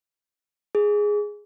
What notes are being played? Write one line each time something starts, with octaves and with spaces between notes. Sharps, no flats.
G#4